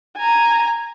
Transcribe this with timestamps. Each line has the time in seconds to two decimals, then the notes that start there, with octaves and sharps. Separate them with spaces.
0.17 G#5 A#5